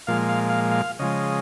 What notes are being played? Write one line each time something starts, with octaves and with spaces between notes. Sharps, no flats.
A#2 F3 G#3 F5
F5
F5
F5
C#3 F3 G#3 D#5